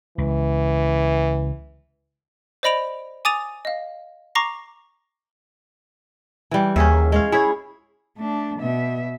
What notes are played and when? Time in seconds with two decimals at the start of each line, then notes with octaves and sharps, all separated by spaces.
0.18 C#2 E3
2.63 C5 D5 D#5 B5 D7 F7
3.25 G#5 D6 D#6 A6 D#7 F7
3.65 D#5 F5
4.35 A#5 C#6 D6 A#6 C7
6.51 E3 G3
6.76 D#2 C#4 G#4 E5
7.12 G#3 C#5 F5
7.32 E4 G#4 C#5
8.18 A3 D4
8.59 B2 E5